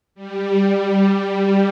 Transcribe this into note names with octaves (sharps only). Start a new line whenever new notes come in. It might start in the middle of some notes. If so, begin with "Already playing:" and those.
G3